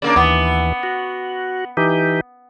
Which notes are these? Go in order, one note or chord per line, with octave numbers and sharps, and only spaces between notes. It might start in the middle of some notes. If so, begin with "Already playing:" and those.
C#3 A#3 D4 D5
D#2 E3 B3
F#4
E3 D#4 G4